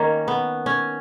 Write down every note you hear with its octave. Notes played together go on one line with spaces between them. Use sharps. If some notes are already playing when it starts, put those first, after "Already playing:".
Already playing: D#3 A#3 C#4
B3
C#4